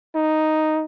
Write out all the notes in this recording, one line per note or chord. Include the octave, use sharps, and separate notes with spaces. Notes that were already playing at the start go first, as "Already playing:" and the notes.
D#4